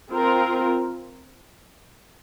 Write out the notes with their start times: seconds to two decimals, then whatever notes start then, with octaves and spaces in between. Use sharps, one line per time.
0.10 C4 F4 A#4